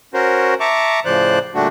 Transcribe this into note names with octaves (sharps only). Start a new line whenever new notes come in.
C#4 F#4 A#4 C5
E5 A5 A#5 C#6 D6
A2 C#3 F3 C5 D5 F#6
A#2 D3 G3 A3 D4 F#4